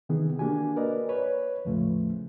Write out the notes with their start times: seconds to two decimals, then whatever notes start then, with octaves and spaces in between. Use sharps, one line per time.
0.09 C3 D#3 E3 B3 G#4
0.39 A#3 D4 F#4 G4 G#5
0.77 A#4 B4 D5 D#5
1.09 B4 C#5
1.65 E2 A2 C#3 F3 A3